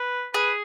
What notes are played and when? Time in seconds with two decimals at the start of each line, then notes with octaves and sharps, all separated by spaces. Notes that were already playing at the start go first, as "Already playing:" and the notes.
Already playing: B4
0.34 G#4 B4